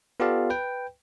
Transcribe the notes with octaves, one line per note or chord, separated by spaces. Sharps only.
B3 F4 G4 A4 D5 F5
B4 G5